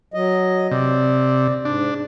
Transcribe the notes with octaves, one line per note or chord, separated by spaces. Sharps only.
F#3 D#5
C3 D5
G#2 D4